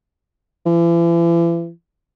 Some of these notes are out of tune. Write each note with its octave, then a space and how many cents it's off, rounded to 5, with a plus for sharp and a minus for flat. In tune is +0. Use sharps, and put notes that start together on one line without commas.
E3 +40